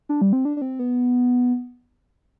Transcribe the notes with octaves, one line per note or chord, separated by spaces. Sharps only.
D4
G3
C4
D4
D4
C4
B3